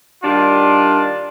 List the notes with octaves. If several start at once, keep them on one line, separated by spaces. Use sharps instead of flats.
D#3 G3 D4 F4